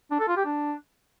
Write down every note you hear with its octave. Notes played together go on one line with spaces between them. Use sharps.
D4
A4
F4
G4
D4